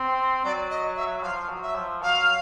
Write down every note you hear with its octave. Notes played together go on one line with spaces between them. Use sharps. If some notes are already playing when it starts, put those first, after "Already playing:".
Already playing: C4
F#3 D5
D#5
E5
F3 F5
F#3
E5
F3
F#3 F5